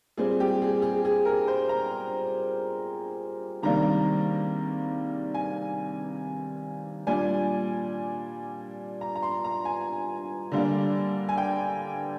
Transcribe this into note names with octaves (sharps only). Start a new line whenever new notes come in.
A#2 G3 C4 G#4
G4
G#4
G#4
G#4
A#4
C5
A#5
C3 D#3 G3 A#3 D4 A#5
G#5
A#2 G3 D4 G#5
A#5
A#5
C6
A#5
G#5
D3 G3 A#3 D4
G#5
G5